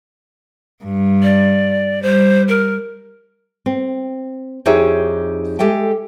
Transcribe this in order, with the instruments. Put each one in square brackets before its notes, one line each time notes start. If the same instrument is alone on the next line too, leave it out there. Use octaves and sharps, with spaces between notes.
[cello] G2
[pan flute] D5
[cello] G3 [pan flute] C5
[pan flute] A#4
[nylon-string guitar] C4
F2 D#4 G4 G#4 C#5 E5
G#3 G4 A4 E5 G5